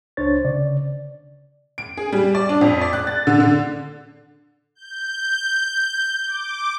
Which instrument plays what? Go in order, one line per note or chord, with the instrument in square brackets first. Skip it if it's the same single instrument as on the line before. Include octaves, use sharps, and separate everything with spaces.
[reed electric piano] C#2 D4 C5 C#5 A6
C#3 D5
[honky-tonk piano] D7
G#4
G3
D5
D4
F2
D5
F#6
A6
D3
D3
[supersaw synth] G6
D6